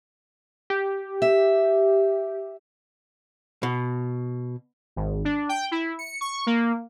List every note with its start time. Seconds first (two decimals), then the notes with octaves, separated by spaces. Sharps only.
0.70 G4
1.22 E5
3.63 B2
4.96 G#1
5.25 D4
5.49 G5
5.71 E4
5.99 C#7
6.21 C#6
6.47 A#3